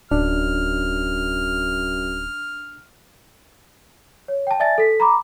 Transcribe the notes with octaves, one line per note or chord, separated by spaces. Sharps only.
D1 F#2 D4 F6
C#5
G5 A5
D5 E5 G#5 A6
A4 B6
A#5 B5 D6